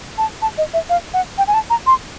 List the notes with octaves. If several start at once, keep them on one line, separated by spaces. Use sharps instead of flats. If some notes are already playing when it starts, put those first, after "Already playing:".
A5
A5
D#5
E5
F5
F#5
G5
G#5
A5
A#5
C6